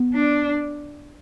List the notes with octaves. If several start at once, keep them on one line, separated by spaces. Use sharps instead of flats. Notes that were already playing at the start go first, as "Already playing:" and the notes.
Already playing: B3
D4